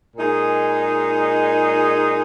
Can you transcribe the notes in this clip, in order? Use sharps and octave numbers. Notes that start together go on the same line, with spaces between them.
A#2 G#3 D#4 G#4